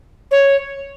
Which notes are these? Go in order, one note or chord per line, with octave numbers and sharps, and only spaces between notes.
C#5